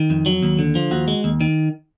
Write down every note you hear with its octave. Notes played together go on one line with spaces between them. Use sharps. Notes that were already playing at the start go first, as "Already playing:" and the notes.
Already playing: D#3
F2
F#3
D#2
D3
F3
D#2 F#4
G#3
D#2
D#3